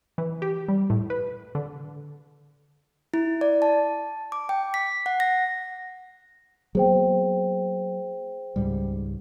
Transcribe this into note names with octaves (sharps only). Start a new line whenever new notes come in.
E3
G4
G3
A2
B4
D3
E4
D5
A5
D6
G5
B6
F#5
A#6
F#3 A#3 B3 G#4 C5 G5
C#2 G#2 G3